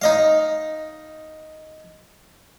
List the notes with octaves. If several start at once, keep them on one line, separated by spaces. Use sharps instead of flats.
D#4 D#5 F5